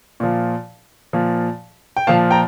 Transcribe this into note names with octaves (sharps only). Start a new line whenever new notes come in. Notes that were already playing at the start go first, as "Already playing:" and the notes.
A#2 F3
A#2 F3
G5
A#2 F3 F5 A5
G5 A#5